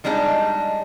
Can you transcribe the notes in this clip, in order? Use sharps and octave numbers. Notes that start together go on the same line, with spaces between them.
F3 G3 G#3 D4 D#4